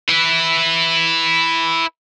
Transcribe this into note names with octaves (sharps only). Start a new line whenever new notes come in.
E4 B4